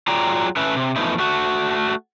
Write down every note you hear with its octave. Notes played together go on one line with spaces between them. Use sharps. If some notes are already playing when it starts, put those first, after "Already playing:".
F#3 F4 G#4 D5 G5 A#5
A3 C#4 B4 E5
C3
E3 F3 A3 B3 D#4 E4
A3 F#4